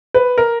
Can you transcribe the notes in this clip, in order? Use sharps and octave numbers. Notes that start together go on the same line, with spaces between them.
B4
A#4